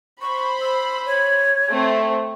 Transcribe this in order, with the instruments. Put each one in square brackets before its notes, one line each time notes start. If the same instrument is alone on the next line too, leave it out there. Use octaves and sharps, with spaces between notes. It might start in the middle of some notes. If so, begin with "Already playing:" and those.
[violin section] C5 B5 [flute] C#6
[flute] E6
C#5
[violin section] A3 C4